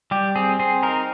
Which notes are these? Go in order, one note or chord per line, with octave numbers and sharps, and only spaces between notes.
G3 G4
C4 G#4
C4 G#4
D#4 A#4